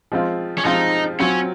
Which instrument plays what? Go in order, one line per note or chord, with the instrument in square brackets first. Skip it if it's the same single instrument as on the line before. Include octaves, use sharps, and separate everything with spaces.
[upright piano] F3 G#3 C4 F4
[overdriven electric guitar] C#4
[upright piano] F3 G#3 C4 F4 [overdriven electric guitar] D#4
[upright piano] F#3 C4 F4 [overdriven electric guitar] C#4